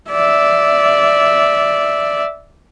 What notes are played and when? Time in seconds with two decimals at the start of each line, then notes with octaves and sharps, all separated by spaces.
0.10 D5 E5